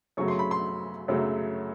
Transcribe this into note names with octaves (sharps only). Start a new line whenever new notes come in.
F#2 C#3 F#3 A3 C#6
C6
B5
C6
F#2 C#3 F#3 A3